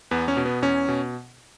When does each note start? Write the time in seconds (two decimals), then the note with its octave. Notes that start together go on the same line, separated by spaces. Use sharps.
0.11 E2 B3
0.28 C#4
0.37 B2
0.45 B3
0.62 E2 C#4
0.88 B2